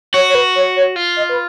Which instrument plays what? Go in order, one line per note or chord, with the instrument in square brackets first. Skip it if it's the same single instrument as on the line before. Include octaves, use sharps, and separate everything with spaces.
[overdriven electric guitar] F#4 [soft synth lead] C#5
[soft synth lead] C#5
B4
C#5
C#5
[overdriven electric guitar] F4
[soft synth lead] D#5
B4